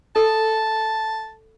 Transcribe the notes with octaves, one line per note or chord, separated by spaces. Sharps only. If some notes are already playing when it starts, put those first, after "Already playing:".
A4 A5